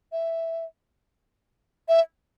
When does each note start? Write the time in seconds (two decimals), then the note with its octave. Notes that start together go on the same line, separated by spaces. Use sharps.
0.12 E5
1.88 E5